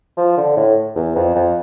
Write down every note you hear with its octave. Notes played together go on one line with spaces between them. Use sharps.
F3
D3
A2
E2
F2
F2